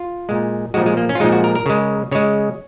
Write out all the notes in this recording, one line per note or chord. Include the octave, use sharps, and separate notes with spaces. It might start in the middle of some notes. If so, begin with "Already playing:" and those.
Already playing: F4
A#2 G#3
A#2 F3 G#3 F#4
G#3
A#3
C#4
F4
A#2 F3 G#3 D#4
F#4
A#4
A#4
C#3 G#3
C#3 G#3 C#5